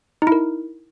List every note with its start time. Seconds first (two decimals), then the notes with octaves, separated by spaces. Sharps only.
0.22 D#4
0.27 E4
0.32 A#4